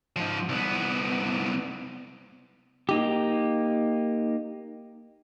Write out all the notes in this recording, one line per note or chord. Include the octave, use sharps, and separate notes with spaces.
G#2 F3
C2 B3
A#3 D#4 G4